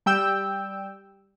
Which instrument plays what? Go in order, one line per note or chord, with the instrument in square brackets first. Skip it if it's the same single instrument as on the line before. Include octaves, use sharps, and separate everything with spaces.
[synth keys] G3 G5 E6 G6